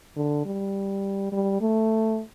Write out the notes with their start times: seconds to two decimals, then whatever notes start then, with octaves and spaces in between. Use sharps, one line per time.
0.17 D3
0.46 G3
1.32 G3
1.61 A3